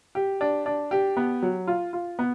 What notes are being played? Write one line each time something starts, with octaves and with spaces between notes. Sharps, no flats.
G4
D4
D4
G4
B3
F#3
F4
F4
B3